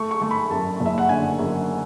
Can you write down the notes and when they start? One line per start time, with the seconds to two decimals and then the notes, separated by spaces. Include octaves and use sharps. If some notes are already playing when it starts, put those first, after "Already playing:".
Already playing: A3 C#6
0.11 C#6
0.21 A3 C#6
0.31 B5
0.50 F#2 A5
0.80 F#1
0.86 E5
0.98 F#5
1.09 D3 G#5
1.39 F#2